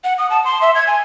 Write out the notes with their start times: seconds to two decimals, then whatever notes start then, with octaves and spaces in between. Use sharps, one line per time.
0.04 F#5
0.18 D#6
0.30 A5
0.45 C6
0.62 E5
0.75 G#6
0.87 G#5